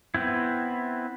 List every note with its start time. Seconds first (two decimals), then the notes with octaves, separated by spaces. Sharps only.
0.14 B3 C4 E4